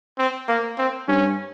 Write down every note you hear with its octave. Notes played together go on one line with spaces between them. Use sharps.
C4
A#3
C4
G2 C#4